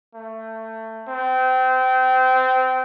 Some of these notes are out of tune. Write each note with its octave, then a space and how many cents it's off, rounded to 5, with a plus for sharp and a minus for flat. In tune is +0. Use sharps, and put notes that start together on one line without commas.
A3 +20
C4 -25